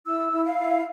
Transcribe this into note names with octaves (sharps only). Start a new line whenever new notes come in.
E4 E6
E4
F5
E4